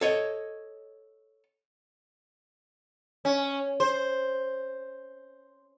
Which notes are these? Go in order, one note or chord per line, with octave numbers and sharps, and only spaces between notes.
A4 C#5 D#5
C#4
C5